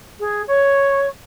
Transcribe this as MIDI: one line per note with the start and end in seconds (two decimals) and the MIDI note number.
0.20 0.42 68
0.47 1.07 73